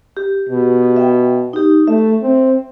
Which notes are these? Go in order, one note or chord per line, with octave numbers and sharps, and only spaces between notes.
G4
B2
E5 G5
D#4 G4
A3 E5
C4